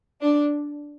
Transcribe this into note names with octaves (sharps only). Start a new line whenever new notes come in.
D4